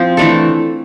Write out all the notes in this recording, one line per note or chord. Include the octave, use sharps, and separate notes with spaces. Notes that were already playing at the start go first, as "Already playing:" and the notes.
Already playing: F3 C4
E3 A3 D4 A4